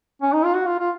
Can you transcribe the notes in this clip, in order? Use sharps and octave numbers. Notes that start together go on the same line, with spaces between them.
C#4
D#4
F4
F#4
F4
F4